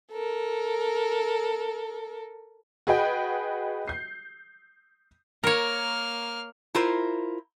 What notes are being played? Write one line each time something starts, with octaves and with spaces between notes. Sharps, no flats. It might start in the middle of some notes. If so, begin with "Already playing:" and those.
A4 A#4
F#4 G#4 B4 D#5 G5
G6 C7
A#3 A#4 C#5 F6
E4 F4 A#4 C5